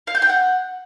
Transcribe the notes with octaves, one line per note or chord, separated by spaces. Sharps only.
F5
G6
G5
F#5